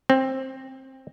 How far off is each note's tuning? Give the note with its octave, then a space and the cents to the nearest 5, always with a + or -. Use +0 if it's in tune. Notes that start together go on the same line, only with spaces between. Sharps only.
C4 +15